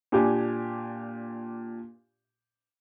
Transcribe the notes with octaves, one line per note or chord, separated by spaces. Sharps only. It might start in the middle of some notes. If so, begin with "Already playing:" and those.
A#2 D4 G4 G#5